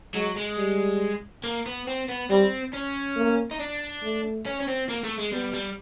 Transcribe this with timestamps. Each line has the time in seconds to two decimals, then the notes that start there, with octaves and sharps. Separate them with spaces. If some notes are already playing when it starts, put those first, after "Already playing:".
0.15 F#3 G#3
0.36 G#3
0.58 G3
1.44 A#3
1.66 B3
1.87 C4
2.08 B3
2.30 G3 C4
2.74 C#4
3.17 A#3
3.51 D#4
3.60 D4
4.03 A3
4.46 C#4
4.60 C#4
4.68 C4
4.89 A#3
5.03 A3
5.18 G#3
5.32 G3 B3
5.54 G3